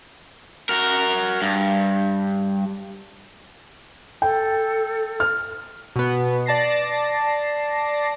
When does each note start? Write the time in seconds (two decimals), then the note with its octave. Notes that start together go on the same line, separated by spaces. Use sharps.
0.69 F#4 A#4
1.42 G2
4.22 A4 G5
5.20 F6
5.96 B2 B3
6.46 D5 A5 A#6 C7